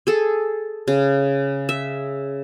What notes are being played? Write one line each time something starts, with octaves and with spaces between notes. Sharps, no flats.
G#4 A4
C#3
E5